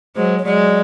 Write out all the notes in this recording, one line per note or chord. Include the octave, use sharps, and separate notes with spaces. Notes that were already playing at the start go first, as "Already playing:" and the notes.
F#3 G#3 C5
C#5
F#3 G#3 D5